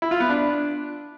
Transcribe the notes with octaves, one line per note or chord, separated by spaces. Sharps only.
E4
F4
B3
D4